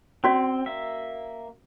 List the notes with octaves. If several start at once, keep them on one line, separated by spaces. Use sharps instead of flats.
C4 C#4 F#4 D5
A#3 E5